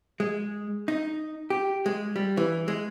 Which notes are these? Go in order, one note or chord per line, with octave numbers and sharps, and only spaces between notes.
G#3
D#4
G4
G#3
G3
E3
G#3